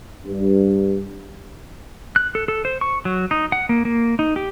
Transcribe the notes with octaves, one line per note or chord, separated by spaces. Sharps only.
G2
F#6
A4
A4
C5
C#6
F#3
D#4
F#5
A#3
A#3
D#4
G4